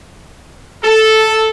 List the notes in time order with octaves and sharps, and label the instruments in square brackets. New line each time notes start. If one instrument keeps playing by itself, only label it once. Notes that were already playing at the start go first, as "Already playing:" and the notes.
[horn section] A4